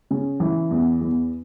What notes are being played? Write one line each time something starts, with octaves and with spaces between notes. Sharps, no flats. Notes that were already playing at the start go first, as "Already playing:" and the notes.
C#3
E3
E2
E2